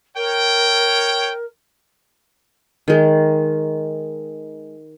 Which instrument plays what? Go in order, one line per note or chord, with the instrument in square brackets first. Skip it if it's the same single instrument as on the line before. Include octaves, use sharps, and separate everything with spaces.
[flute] A#4 [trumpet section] C#5 G5
[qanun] D#3 G#3